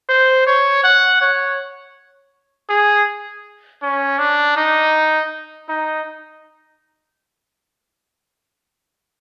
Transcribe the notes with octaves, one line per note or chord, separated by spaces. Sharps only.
C5
C#5
F#5
C#5
G#4
C#4
D4
D#4
D#4